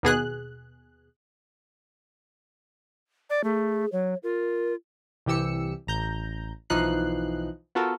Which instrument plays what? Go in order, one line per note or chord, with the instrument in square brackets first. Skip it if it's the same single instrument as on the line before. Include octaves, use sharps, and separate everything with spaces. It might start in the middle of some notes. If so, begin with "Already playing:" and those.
[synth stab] D#2 B2 G#4 F#6
[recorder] D5
[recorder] A3 [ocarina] G#4
[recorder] F#3 [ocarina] C#5
[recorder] F4 [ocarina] A#4
[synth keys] C2 E3 G4 E6 C#7
A1 A#5 G6
B1 E3 F3 D#4 F#6 C7
B3 F4 F#4 A4 A#4